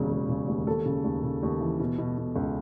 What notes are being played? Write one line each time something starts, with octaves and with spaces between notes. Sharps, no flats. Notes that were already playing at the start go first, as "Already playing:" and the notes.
Already playing: E1 D#2 C#3
E1
C#3
D#2
D#2 A4
C#3
D#2
C#3
D#2
E3
B2
B2
B2
C#2